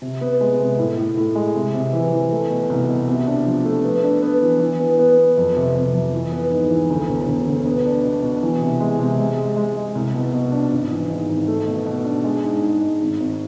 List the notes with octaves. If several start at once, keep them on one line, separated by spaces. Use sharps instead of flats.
C3
B3
G#3
C3
A2
A2
A2
G#3
C3
C3
E3
E3
A3
B2
C2
B2
C3
D4
F3
A3
B3
D4
B3
E3
E3
B3
B3
B3
F2
C3
C3
F2
E3
B3
G#2
E3
D2
E1
E1
D2
B3
D4
B2
B2
E3
C3
G#3
C3
G#3
G#3
G#3
G#3
C2
B2
B2
D4
G#1
E3
G#2
G#1
A3
B2
B2
D4
G#3
G#2
G#2
G#2
G#1
G#1